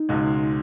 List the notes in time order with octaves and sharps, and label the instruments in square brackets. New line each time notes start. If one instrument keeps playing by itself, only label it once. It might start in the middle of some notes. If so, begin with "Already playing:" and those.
Already playing: [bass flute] D#4
[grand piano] C#2 B2 G#3